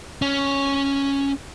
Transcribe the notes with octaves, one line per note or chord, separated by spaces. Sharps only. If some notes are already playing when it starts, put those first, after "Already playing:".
C#4